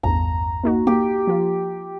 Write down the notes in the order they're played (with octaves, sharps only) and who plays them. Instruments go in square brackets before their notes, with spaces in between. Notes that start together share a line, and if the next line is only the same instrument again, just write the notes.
[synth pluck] A1 E2 G2 [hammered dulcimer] A#5
[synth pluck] A#3 D#4 F#4
[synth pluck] A#3 [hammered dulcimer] G4
[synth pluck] F3 F4